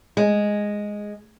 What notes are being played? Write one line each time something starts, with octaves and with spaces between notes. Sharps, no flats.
G#3